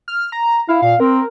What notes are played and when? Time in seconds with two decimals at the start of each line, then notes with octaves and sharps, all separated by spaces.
0.08 F6
0.32 A#5
0.69 E4 F5
0.82 A#2 F5
1.00 C4 A#4